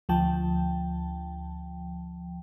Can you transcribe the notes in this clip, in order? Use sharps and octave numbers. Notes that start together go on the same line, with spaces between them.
D2 F3 G5 A5